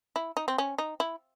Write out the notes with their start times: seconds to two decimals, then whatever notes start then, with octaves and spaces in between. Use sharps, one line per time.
0.16 E4
0.37 D#4
0.48 C4
0.58 C#4
0.78 D#4
1.00 E4